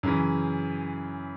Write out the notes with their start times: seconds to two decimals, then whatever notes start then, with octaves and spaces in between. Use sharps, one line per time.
0.03 F#2 C#3 E3